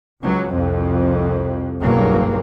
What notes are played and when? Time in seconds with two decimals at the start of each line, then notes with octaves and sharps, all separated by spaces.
0.22 C#2 F#3
0.53 C2 F2
1.82 F#1 B1 G2 F#3 A#3